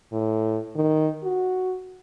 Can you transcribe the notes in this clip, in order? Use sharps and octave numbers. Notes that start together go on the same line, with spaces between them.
A2
D#3
F#4